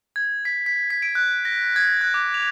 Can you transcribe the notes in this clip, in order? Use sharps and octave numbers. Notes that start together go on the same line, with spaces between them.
G#6
B6
B6
B6
D7
F#6
A#6
G#6
F#6
D6
F7